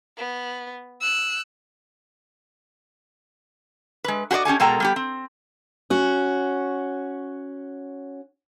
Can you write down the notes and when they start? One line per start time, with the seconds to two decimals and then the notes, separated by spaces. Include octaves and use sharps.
0.17 B3
1.01 E6 F#6
4.04 G#3 B4
4.31 F#4 G4 C5 D5 D#5
4.45 C#4 G4 A4 G#5
4.60 B2 G#3 A4 A#4 G5 A#5
4.80 G3 B3 G4
4.96 C4
5.90 C#4 F#4